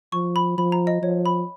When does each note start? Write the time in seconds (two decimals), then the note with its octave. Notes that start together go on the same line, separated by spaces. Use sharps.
0.12 F3 C#6
0.36 B5
0.58 F3 B5
0.72 A#5
0.87 D#5
1.02 F3 C#5
1.26 B5